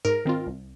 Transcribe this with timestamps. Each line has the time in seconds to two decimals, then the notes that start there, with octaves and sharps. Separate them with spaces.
0.05 G#2 A#4
0.25 D#3 C4 F4
0.47 C2